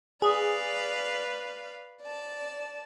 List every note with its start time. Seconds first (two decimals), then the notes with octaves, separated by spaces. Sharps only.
0.22 G#4 B4 D5 F5
2.03 D5 A5